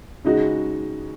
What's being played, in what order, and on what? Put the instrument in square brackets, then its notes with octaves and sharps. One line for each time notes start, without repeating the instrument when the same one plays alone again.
[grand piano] C#3 G#3 D#4 F#4